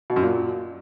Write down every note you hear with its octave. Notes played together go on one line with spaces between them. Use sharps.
B2
F#2
A#2